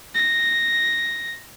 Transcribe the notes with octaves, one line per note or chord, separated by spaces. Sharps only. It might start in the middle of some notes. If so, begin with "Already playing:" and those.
A#6